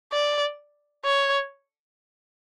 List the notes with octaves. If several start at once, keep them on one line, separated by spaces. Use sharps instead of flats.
D5
C#5